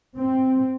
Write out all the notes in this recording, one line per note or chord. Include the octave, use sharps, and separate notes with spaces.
C4